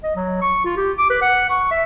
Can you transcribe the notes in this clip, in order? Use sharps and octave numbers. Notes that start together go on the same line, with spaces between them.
D#5
F#3
C#6
F4
G4
D6
B4
F#5
C#6
E5